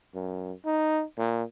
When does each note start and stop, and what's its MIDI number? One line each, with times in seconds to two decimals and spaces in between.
0.15 0.52 42
0.65 1.03 63
1.18 1.43 46